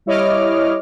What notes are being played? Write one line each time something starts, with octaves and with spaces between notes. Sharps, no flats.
G3 E4 C#5 D#5 D6 F6